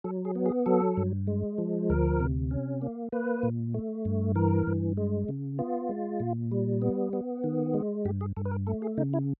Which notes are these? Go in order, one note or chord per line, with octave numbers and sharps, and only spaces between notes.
F#3 A4
G#4
B3
G#4
F#3 A4
G2
G#3
F3
D2 A#4
C3
C#4
A#3
A#3 B4
A#2
A3
G2
E3 A#4
G2
G#3
C#3
B3 F4
G#3
A#2
G3
B3
B3
D#3
G#3
G2 G4
G#4
G2 A4
B4
A#4
A3 A4
G#4
C#3 D#4
E4